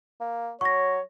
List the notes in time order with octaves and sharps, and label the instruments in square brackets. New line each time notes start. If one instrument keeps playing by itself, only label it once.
[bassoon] A#3
[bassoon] F#3 [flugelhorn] C#5 [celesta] C#6 A#6